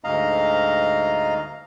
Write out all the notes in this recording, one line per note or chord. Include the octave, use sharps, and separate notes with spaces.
D2 G#2 D#5 F5 A#5